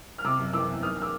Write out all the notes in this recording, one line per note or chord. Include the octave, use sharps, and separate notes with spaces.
F6
C3 D6 E6
F#1
E3 D6 E6
E2
D#3 D#6 F6
F6
D6 E6